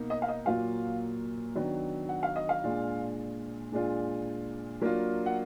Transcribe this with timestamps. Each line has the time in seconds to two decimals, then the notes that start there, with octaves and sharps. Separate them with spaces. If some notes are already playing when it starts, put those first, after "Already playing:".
Already playing: B2 A#3 D#4
0.10 D#5
0.22 F5
0.28 D#5
0.46 A#2 F#3 A#3 F4 F5
1.55 D#3 F#3 B3 D4
2.09 F#5
2.23 F5
2.36 D#5
2.49 F5
2.64 A#2 G#3 D4 F4
3.72 A#2 G#3 D4 F4
4.81 F#3 A#3 D4 F4
5.26 F#5